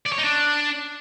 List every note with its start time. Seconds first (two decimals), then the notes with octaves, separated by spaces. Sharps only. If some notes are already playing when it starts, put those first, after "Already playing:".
0.06 D5
0.12 C#5
0.18 D#4
0.24 D4